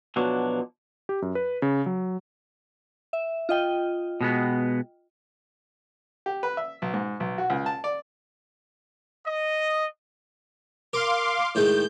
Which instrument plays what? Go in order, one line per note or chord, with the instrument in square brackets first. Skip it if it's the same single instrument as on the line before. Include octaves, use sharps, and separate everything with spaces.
[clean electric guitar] B2 F3 F#3 D4
[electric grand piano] G4
F#2
B4
C#3
F#3
[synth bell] E5
F4 D#5 G5
[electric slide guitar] B2 G#3 B3
[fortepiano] G4
B4
E5
B1
G#2
B1
F#4
C#2
A5
D5
[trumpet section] D#5
[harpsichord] A#4 [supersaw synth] F5 C6 D6
[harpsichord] A2 D#3 G#3 [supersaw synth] G6